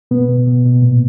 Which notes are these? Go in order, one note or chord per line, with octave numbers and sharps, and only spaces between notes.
B2 B3
B2
B2
B2
A#2